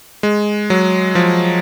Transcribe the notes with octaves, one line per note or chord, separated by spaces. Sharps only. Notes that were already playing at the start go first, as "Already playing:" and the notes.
G#3
F#3
F3